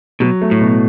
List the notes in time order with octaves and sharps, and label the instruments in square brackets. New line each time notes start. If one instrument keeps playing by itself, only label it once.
[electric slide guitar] B2 [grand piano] F#3
[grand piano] A3
[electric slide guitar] A2
[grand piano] B2